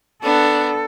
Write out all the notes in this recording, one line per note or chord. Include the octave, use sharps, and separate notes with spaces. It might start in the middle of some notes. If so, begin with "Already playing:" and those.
B3 D4 A4